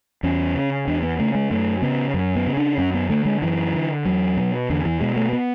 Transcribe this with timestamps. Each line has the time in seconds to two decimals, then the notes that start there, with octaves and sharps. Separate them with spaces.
0.23 E2 C#4
0.55 C#3
0.87 E2 D4
1.03 B3
1.19 C#3 A3
1.35 G#3
1.51 F#2 A3
1.82 C#3 B3
2.14 F#2
2.36 B3
2.47 C#3
2.57 D4
2.78 F#2 C#4
2.94 B3
3.10 D3 A3
3.25 G#3
3.42 F#2 E3
3.74 D3
4.05 E2 F#3
4.37 B2
4.70 E2 D3
4.85 E3
5.01 B2 G#3
5.16 A3
5.33 B3